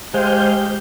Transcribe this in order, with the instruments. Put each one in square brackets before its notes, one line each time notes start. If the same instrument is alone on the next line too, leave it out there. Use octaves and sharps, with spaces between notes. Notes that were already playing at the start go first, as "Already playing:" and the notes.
[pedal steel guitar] G#3 [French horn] G4 [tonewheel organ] C5 F5 G6